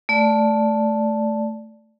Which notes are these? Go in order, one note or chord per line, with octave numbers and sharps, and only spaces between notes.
A3 D5